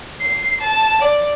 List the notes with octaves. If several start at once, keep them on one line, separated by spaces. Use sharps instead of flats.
C7
A5
D5